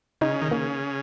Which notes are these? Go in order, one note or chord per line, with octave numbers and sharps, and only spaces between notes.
C#3 D#4
D#3
C#3 A#3